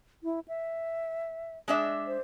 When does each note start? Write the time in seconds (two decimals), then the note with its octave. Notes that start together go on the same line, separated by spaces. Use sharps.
0.24 E4
0.48 E5
1.68 G#3 D4 E5
2.07 C5